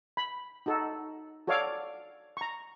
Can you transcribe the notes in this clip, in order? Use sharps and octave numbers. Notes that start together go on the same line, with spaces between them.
B5
D#4 F#4 A4
F#4 A4 C#5 D5 F5 D6
A#5 C#6